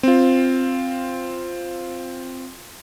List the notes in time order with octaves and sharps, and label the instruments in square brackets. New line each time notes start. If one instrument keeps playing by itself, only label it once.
[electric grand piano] C4 F4